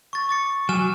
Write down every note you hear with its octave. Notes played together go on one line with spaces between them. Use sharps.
C#6 A6
D6 A6 C#7
F#3 G#5 F6 E7